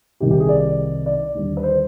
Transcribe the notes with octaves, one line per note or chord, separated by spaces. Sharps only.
C2 C3 D#3 G4
G4
G#4
D5
D5
D#2 D3 G3
B4
C5